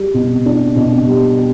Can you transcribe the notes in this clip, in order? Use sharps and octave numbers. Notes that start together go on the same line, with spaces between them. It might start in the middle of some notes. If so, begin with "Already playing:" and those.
Already playing: G3
B2
D4
B2
G3
G4